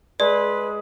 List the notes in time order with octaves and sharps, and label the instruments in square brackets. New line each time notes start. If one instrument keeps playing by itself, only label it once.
[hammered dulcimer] G#3 [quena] B4 [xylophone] D5